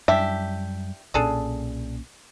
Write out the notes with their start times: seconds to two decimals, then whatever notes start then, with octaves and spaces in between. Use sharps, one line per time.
0.08 F#2 G3 D4 E4 G4 E5
1.14 B1 A#2 C#4 D4 G#4 A4